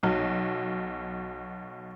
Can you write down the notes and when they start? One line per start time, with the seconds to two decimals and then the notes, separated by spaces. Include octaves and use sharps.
0.03 B1 B2